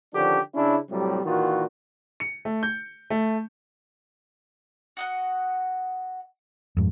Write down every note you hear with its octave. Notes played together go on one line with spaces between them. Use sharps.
D3 D#3 F3 C#4 D4 G4
C#3 C#4 D4 E4
A2 C3 F#3 G3
A#2 D#3 E3 F4 F#4
C#7
A3
G6
A3
F#4 D#5 F#5
F2 G#2